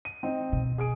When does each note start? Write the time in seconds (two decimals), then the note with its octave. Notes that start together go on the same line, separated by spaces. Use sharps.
0.05 D#7
0.23 C4 D#4
0.52 B2
0.78 G#4 D#6 D7